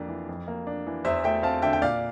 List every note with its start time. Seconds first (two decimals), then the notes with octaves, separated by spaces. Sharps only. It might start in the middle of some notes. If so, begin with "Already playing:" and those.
Already playing: F2 A#3 D4
0.08 E3
0.29 F2
0.48 A#3
0.67 D4
0.86 E3
1.05 E2 C5 E5
1.24 A3 E5 G5
1.43 C4 F5 A5
1.62 D3 E5 G5
1.73 G5
1.82 A#2 D5 F5